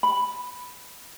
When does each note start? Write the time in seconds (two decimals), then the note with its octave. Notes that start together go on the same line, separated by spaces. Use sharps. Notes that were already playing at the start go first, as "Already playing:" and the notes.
0.03 B5